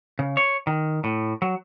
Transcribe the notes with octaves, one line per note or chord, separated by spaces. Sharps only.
C#3
C#5
D#3
A2
F#3